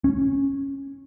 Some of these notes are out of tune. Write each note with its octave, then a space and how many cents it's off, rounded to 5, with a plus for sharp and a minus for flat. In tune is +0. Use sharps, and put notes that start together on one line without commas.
C#4 -10